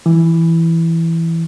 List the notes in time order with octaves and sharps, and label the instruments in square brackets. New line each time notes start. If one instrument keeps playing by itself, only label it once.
[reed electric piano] E3